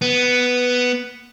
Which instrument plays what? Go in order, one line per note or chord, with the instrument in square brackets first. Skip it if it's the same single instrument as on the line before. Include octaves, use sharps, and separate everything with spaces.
[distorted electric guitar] B3